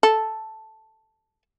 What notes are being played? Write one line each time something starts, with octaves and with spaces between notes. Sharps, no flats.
A4